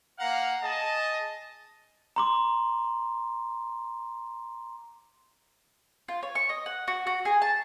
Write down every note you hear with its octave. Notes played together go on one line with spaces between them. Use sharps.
A#3 F5 F#5 A#5
G#4 D#5 A5
A#5 C6 D6
F4
C#5
C#6
D#5
F#5
F#4
F#4
G#4
A5